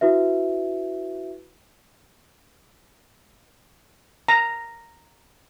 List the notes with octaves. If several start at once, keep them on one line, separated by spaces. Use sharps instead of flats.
E4 F#4 B4 E5
A#5